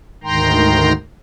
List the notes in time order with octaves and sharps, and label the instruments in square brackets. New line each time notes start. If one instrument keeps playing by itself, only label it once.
[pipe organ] D2 G#2 D#3 G5 A#5 C6